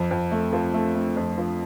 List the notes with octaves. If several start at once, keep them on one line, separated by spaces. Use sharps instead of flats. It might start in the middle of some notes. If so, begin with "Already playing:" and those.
Already playing: F2
F2
A3
F3
A3
A3
F2
F3